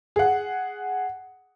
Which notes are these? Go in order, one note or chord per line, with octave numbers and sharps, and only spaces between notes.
G#4 F#5